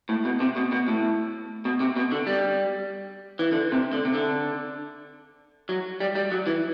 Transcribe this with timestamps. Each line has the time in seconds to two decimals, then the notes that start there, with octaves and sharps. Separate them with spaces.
0.09 A2
0.25 B2
0.40 C3
0.56 B2
0.72 B2
0.88 A2
1.65 B2
1.80 C3
1.96 B2
2.12 D3
2.27 G3
3.39 E3
3.52 D3
3.72 C3
3.93 D3
4.05 C3
4.14 D3
5.69 F#3
6.00 G3
6.15 G3
6.32 F#3
6.47 E3